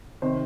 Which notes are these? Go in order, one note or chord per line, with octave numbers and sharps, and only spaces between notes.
C3 D#3 C5